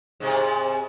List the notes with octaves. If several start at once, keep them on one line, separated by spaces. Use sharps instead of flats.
G#2 C3